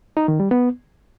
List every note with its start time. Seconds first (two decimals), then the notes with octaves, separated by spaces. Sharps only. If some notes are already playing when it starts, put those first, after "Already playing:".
0.17 D#4
0.28 D#3
0.40 G3
0.51 B3